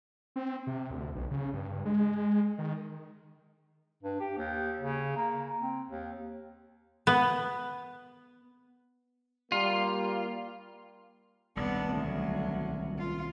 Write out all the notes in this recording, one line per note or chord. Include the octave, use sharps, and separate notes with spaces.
C4
C3
D2
B1
C#3
G2
G#3
D#3
G2
G4
D#2
C#3
A#3
C4
D#2
B3
G3 A#3 F4
D#1 C2 B3 D4
D2 F#3
F4